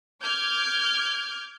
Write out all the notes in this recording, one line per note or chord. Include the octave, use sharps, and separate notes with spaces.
D6 F6 G6 G#6